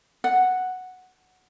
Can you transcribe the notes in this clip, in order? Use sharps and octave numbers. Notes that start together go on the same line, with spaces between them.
F#5